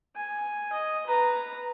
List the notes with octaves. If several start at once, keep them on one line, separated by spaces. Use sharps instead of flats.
G#5
D#5
B4 A#5